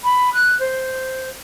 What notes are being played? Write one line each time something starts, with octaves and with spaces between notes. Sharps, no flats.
B5
F#6
C5